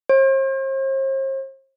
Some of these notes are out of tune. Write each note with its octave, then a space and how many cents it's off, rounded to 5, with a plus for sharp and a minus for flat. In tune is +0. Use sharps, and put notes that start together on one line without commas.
C5 +45